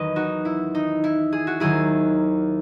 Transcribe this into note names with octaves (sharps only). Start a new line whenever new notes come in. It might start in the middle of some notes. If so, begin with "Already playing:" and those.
Already playing: E2 D#3 F#3 B4 D#5
D#4 F#4
E4
D#4
E4
G#4
F#4
D#2 D#3 F#3 E4 G#4